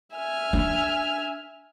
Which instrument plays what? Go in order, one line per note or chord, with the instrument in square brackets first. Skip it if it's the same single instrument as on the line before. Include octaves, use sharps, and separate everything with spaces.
[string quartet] E5 G#5 F6
[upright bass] D4